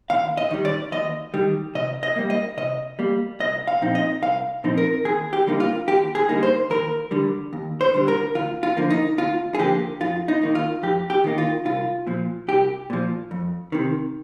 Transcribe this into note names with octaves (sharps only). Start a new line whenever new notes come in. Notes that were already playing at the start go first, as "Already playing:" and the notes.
D#2 F5
D#5
D#3 G3
D5
D#2 D#5
D#3 G3
C3 D#5
D#5
G3 A#3
D#5
C3 D#5
G3 A#3
C2 D#5
F5
A#2 F3 C4 D#4
D#5
C2 F5
A#2 F3 C4 D#4
A#4
D#2 G#4
G4
D3 G3 A#3 D#4
F4
D#2 G4
G#4
D3 G3 A#3 D#4
C5
D#2 A#4
D3 G3
D#2
C5
D3 G3
A#4
D2 F4
F4
D3 F3 A#3
D#4
D2 F4
G#4
D3 F3 A#3 G4
F2 F4
D#4
D#3 A#3 D#4
F4
F2 G4
G4
D#3 A#3 D#4
F4
C2 F4
A#2 F3
C2 G4
A#2 F3
F2
C3 D#3